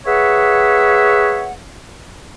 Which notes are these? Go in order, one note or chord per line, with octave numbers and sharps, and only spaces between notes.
G#4 B4 C#5 E5 F#5